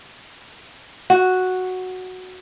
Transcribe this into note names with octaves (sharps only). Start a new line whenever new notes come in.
F#4